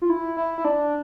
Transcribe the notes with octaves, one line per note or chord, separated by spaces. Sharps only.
F4
E4
E4
E4
D4